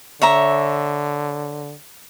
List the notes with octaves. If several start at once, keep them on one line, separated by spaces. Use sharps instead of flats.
D3 C#5 E5 A#5